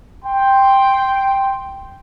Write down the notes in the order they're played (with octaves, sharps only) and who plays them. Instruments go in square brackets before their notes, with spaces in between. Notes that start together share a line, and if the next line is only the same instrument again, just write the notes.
[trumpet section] G5 C6